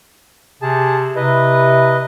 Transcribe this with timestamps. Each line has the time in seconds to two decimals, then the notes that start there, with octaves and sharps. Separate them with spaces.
0.62 C3 G#4 A5
1.16 C3 E4 B4 D#5